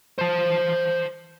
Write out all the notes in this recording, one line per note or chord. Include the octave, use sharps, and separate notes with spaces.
C5 A5